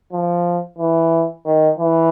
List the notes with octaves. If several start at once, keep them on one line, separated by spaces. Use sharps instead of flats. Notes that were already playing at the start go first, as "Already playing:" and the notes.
F3
E3
D#3
E3